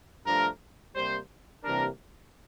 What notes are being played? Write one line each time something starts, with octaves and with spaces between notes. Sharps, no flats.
G2 F3 A3 D4 A#4
C3 G3 A#3 C5
C3 E3 G3 A#3 D4 A#4